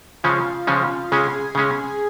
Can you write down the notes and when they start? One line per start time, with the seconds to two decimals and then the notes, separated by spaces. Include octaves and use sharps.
0.23 C#3 F3 G#3 C#4 F4 F5
0.67 C#3 F3 G#3 C#4
1.11 C#3 G#3 C#4 G#4 G#5
1.55 C#3 G#3 C#4